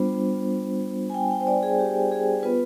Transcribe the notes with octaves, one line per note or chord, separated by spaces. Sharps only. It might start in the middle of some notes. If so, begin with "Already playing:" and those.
Already playing: G3 B3 D4 F4 C5
G#5
G5
G5
C5
D5
G#4
G4
G#4
B3 F4 B4